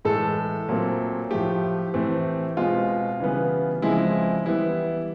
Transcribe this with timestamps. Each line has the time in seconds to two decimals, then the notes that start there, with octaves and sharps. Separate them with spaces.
0.05 A2 E3 G#3 A4
0.69 A#2 F#3 A3 C4
1.30 A2 F3 A3 G4
1.94 A2 E3 A3 C4
2.57 B2 G#3 C4 F4
3.20 C#3 E3 G3 B3
3.82 C#3 F3 G#3 C4 E4
4.45 E3 G3 B3 E4